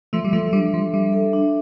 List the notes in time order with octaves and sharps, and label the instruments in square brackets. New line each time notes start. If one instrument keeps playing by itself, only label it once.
[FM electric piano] F3 A3 [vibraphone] E5
[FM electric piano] G3
[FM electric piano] F3 A3 [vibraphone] A4
[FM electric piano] G3 [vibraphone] D4
[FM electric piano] F3 [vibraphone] D4
[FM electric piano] G3 [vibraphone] E5
[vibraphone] A4
D4